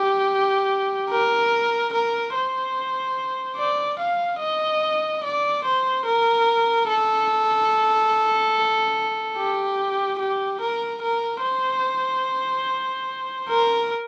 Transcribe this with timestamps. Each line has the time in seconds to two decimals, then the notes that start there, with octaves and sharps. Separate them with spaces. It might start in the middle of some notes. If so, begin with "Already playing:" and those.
Already playing: G4
1.10 A#4
1.93 A#4
2.35 C5
3.58 D5
3.99 F5
4.40 D#5
5.24 D5
5.65 C5
6.06 A#4
6.89 A4
9.37 G4
10.19 G4
10.61 A#4
11.02 A#4
11.43 C5
13.49 A#4